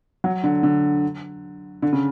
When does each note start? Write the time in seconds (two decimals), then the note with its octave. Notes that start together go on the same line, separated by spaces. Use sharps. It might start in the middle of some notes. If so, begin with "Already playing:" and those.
0.24 F#3
0.44 D3
0.63 D3
1.82 D3
1.93 C#3